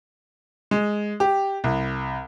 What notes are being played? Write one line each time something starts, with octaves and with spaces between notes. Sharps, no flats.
G#3
G4
C2